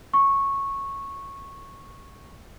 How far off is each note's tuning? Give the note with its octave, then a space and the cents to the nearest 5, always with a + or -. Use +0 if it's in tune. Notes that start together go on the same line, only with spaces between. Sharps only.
C#6 -10